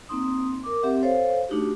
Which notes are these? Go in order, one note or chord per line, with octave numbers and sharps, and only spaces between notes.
A#3 C4 D#4 C6 D#6
A#4 D6
C4 G4 E5 F#5
A4 C5 C#5 F5
A3 D4 D#4 F#4 G4